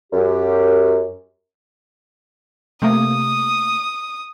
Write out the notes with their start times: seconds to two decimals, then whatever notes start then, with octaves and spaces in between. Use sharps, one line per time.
0.13 F#2 G4
2.82 C3 A3 A#3 D#6